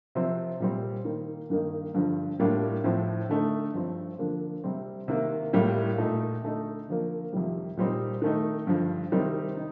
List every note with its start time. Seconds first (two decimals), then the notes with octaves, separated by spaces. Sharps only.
0.15 C3 F3 C4
0.60 A#2 G3 C4
1.05 D#3 A#3 D#4
1.50 G2 D#3 A#3 D#4
1.94 G2 D3 F3
2.39 A2 G3 A#3 D4 F4
2.84 A2 F3 C4
3.29 D3 A3 D#4
3.74 G2 F3 C4
4.19 D3 F3 A#3 D4
4.64 C3 G3 C4
5.08 C3 D#3 A#3
5.53 A2 G3 A#3 F4
5.98 A#2 A3 D#4
6.43 D3 A3 D#4
6.88 D3 F3 A#3
7.33 F2 C3 D#3 G3
7.77 A#2 G3 C4 D#4
8.22 D#3 A3 D#4
8.67 G2 D3 F3
9.12 C3 D#3 G3 C4 D#4
9.57 D#4